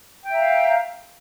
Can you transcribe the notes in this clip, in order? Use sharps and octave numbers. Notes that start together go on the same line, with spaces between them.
E5 F5 G5 A#5